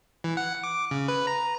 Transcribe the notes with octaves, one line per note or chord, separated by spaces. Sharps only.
E3
F#5
D6
C#3
B4
A#5